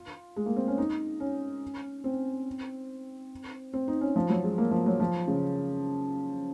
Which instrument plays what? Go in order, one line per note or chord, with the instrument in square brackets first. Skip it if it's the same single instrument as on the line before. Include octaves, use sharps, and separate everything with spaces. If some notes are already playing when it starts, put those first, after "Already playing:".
Already playing: [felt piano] F4
G#3
A#3
C4
C#4
D#4
C#4
C4
C4
D#4
C#4
F3
F#3
G#3
A#3
F3
F#3
F3
C#3